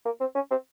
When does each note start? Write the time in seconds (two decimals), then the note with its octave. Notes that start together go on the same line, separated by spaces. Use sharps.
0.05 A#3
0.20 C4
0.35 C#4
0.51 C4